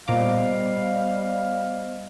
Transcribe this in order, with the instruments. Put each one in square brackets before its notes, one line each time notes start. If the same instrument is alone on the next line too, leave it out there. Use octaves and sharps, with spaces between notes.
[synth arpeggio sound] A#2 A#5 D6 [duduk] G3 [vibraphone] B3 C5 D#5 [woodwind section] F5